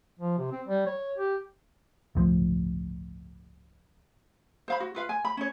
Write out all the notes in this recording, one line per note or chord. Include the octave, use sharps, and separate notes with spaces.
F3
C3
C4
G3
C#5
G4
G1 C#2 A2 F3
C5 F5 B5
F#4
F4 B4 F5
G#5
B5
C#4 C#5